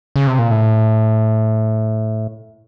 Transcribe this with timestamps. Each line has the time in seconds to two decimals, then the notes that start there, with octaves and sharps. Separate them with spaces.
0.16 C#3
0.27 C3
0.39 A#2
0.50 A2